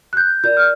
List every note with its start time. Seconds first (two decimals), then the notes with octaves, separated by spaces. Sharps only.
0.13 F#6
0.17 G6
0.44 F4 A#4 D5 G6
0.57 F6